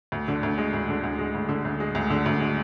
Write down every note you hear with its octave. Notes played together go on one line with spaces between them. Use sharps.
D2
D3
D2
G#3
D2
D3
D2
G#3
D2
D3
D2
G#3
D2
D3
D2
G#3